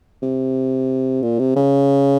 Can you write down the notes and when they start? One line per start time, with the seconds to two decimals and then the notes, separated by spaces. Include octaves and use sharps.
0.23 C3
1.22 A#2
1.39 C3
1.56 C#3